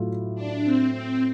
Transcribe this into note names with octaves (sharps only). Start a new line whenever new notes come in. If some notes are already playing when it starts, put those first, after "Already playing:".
Already playing: A2 F#3 F4
D4
C4
C4